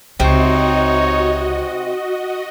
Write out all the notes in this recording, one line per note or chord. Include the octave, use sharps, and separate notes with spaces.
C#2 C3 C4 D#4 F#4 C#5 D#5